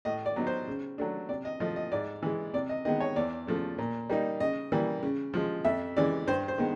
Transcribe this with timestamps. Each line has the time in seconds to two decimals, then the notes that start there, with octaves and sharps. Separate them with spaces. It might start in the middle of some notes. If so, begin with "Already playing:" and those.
0.05 A2 D#5
0.26 D5
0.36 F#3 B3 D#4
0.47 C5
0.68 C#3
0.98 F#3 A3 D4
1.29 C3 D5
1.45 D#5
1.60 F3 A3 D#5
1.76 D#5
1.92 G#2 D5
2.22 E3 G#3
2.54 C3 D5
2.69 D#5
2.85 D#3 G#3 B3 D#5
3.00 C#5
3.16 E2 D5
3.47 C#3 F3 A3
3.78 A#2
4.09 G3 A#3 D#4
4.40 C#3 D#5
4.72 E3 G3 A#3
5.03 C#3
5.34 F3 G#3
5.65 F2 E5
5.97 C#3 E3 G#3 D5
6.27 G2 C5
6.48 C5
6.58 D#3 G#3 B3